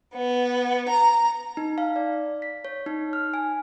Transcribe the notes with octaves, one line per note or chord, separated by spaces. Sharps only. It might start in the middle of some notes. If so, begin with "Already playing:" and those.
B3
A#5
D#4
F5
D5
B6
C#5
D#4
F6
G#5